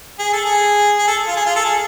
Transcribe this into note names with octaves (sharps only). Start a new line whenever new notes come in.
G#4
A4
G#4
G#4
A4
F4
G#4
F4
A4
G#4